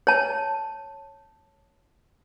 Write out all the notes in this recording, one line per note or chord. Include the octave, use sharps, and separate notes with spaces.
C#5 A5